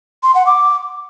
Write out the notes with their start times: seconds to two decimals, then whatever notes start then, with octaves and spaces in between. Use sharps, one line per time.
0.23 C6
0.35 F#5
0.46 D6